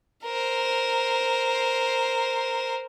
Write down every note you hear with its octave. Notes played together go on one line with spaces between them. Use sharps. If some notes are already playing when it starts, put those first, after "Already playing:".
A#4 C5